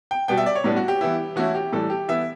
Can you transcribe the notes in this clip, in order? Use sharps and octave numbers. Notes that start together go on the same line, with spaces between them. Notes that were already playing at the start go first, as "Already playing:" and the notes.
G5
B2 G3 B3 G5
E5
D5
C#5
A2 G3 B3 D4
F#4
G4
E3 B3 E4
E3 A3 C#4 E4 F#4
G4
A2 E3 G3 A4
G4
E3 B3 E4 E5